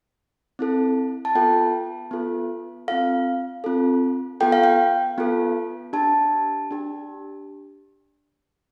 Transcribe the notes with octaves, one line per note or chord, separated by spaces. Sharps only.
C4 E4 A4
A5
B3 F4 A4 G5
B3 F4 A4
C4 F4 A4 F5
C4 F4 A4
B3 F4 A4 G5
F5
G5
B3 F4 A4
D4 G4 A5
D4 G4